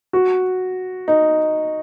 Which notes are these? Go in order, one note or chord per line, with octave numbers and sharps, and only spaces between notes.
F#4
D#4